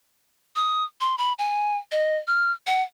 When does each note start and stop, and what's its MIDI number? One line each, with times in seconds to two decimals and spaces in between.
0.56 0.84 87
1.01 1.18 84
1.18 1.33 83
1.39 1.77 80
1.92 2.17 75
2.28 2.52 89
2.67 2.82 78